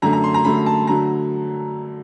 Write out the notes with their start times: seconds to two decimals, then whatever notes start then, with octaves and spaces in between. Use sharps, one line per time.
0.02 F#2 D3 F#3 A3 A#5
0.13 A#5
0.24 C6
0.34 A#5
0.45 F#2 D3 F#3 A3 B5
0.66 A5
0.87 D3 F#3 A3 A#5